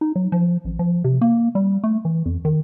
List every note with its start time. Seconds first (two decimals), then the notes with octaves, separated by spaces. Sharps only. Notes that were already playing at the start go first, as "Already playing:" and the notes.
0.01 D#4
0.16 F#3
0.32 F3
0.65 A1
0.79 F3
1.04 C3
1.21 A#3
1.55 G3
1.84 A3
2.05 E3
2.26 F2
2.45 D#3